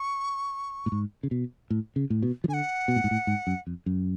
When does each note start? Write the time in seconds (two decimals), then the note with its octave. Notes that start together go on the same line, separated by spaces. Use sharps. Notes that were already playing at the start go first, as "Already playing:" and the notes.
Already playing: C#6
0.86 A2
0.92 G#2
1.23 C#3
1.31 B2
1.70 A2
1.96 C#3
2.10 A2
2.23 B2
2.44 F3
2.48 D3 G#5
2.54 F#5
2.88 B2
2.96 A2
3.04 G#2
3.11 A2
3.27 G#2
3.47 F#2
3.67 F2
3.86 F#2